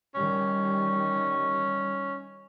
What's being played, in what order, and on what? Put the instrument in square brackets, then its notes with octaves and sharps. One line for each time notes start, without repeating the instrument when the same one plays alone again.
[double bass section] D#3 G3 [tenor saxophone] C#4